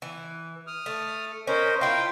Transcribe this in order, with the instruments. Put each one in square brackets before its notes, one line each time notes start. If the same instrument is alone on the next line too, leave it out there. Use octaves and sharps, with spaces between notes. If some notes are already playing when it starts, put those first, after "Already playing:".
[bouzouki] E3
[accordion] D#6 F6
[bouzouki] A3
[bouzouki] C#4 [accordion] A#4 C5 D#5
[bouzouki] E4 F4 [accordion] G5 C6